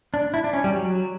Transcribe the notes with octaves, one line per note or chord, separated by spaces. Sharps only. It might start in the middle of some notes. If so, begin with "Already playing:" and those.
D4
E4
D4
C#4
G3
F#3